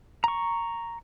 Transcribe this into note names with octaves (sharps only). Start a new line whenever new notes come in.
A#5 C#6